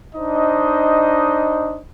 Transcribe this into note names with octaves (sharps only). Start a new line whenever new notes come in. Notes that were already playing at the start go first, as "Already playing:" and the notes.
D4 D#4 C5 D#5